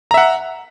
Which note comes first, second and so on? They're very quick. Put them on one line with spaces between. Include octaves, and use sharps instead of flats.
A#5 E5 F#5